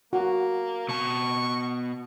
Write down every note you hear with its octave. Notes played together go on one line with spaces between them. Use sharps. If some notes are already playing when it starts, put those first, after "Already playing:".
A#3 F#4
B2 A5 C#6